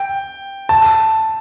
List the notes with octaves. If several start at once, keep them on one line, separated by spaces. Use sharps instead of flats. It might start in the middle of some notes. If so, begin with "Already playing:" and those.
Already playing: G5
A5